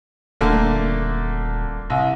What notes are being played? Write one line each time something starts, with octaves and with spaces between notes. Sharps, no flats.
D#1 D3 A3 A#3
C2